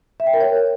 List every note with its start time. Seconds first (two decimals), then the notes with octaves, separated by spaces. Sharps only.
0.20 E5
0.27 G5
0.34 A#4
0.41 C#5